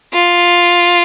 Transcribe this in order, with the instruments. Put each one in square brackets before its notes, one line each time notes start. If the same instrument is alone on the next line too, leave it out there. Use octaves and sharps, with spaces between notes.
[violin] F4